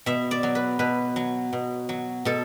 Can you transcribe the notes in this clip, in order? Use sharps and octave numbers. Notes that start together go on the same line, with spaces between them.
B2 E5
D5
F#3
B4
B2 B4
F#3
B2
F#3
B2 A4